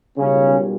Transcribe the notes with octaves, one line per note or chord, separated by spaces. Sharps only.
B1 A#2 C#3 G3 C#4